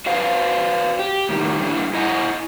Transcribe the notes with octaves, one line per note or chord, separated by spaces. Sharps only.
F#4 B4 C5 D5 F5
G4
A2 D#3 G3
G3 D4 E4
E4 D#5 F#5 G#5 A#5